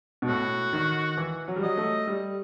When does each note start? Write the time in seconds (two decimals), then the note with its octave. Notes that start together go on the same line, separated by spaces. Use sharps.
0.22 B2
0.28 A2 F#4
0.73 D#3
1.17 E3
1.48 F#3
1.56 G3
1.63 F#3 D#5
1.77 A3
2.07 G3